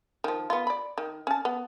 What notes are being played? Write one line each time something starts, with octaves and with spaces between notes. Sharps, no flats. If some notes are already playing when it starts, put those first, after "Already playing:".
D#3 F3
B3 F4
D5 B5
D#3
C#4 A5
B3